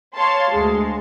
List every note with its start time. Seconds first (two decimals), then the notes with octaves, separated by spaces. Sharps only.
0.14 C#5 F5 A5 C6
0.51 D2 G#3